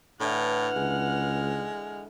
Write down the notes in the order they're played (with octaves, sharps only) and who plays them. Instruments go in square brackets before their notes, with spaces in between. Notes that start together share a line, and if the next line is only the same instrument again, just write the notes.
[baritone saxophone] A2 [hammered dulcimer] D3 E3 [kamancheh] F#5 F6
[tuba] C#2 [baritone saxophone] G#3